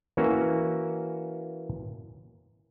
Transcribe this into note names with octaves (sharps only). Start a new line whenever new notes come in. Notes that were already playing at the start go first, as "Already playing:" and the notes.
E3 A#3 C#4 F#4